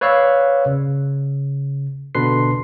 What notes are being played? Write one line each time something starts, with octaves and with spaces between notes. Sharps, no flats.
B4 C#5 D5 F5 E6 F#6
C#3
B2 D3 D4 B4 C6 C7